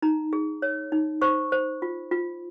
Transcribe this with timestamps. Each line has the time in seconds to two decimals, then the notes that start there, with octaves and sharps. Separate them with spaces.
0.02 D#4 A#5
0.33 G#4
0.62 C#5
0.92 D#4
1.22 C5 C#6
1.52 C5
1.82 F4
2.11 F4